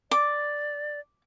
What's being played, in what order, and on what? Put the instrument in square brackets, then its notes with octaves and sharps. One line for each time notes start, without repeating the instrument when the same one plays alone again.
[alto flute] D5 [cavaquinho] D6